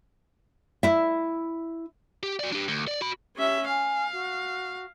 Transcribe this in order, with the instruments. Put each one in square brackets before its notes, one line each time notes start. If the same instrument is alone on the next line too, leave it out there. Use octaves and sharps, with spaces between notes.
[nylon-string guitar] E4 E5
[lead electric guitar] G4
F#4 D5
D4 G4
D2
D5
F#4 B5
[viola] C#4 E5 [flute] G4
[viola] F5 [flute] G#5
[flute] F#4